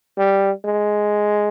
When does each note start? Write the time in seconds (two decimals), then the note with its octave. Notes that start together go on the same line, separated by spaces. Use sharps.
0.18 G3
0.65 G#3